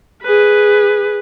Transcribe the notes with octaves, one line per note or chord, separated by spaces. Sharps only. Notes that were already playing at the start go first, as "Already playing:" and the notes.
G#4 B4